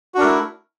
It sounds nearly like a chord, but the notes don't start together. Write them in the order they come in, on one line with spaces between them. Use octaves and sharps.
F#4 D4 A#4 A3 E4